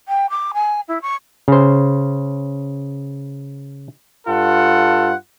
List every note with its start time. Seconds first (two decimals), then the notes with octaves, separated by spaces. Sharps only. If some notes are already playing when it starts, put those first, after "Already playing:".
0.08 G5
0.29 D6
0.54 G#5
0.88 E4
1.02 C#6
1.48 C#3 C5
4.28 G2 F4 A4 F#5